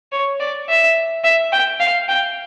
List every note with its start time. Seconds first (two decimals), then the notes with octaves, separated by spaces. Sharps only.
0.12 C#5
0.40 D5
0.69 E5
1.24 E5
1.52 G5
1.80 F5
2.08 G5